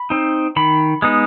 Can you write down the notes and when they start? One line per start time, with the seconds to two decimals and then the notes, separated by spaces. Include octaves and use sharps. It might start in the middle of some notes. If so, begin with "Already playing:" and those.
Already playing: B5
0.10 C4 D#4
0.56 D#3 B5
1.02 G#3 B3 D#4